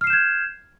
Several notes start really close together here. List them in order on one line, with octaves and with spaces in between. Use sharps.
F6 C7 E7 G6 G#6